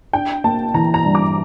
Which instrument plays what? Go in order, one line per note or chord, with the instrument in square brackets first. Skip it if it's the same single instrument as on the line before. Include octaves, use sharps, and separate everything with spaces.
[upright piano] D4 [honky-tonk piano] G5
[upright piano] A#3 [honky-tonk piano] A5
[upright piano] E3 [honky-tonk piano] A#5
[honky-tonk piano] A#5
[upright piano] G2
[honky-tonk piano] D6